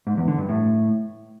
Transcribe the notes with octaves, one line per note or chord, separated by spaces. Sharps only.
G#2
E2
D3
G2
A2